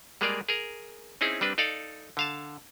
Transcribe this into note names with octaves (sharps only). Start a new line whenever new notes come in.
G3 G#3 A#3 G#4 A#4 D5
G#4 A#4
C4 C#4 D#4 E4 G#4
G3 C4 D4 B4
D#4 A4 D5 F5
D3 F5 A5